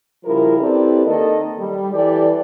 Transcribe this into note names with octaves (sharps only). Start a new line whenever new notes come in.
C#3 F3 G3 E4 A#4
C4 E4 G4 A4 B4 D5
D#3 A#3 A4 D#5
G3
E3 G4 A4 D5